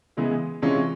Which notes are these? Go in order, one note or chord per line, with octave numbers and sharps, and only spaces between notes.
C#3 E3 G#3 B3
C3 E3 G#3 C#4 F4